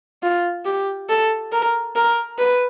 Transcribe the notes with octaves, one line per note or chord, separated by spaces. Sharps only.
F4
G4
A4
A#4
A#4
B4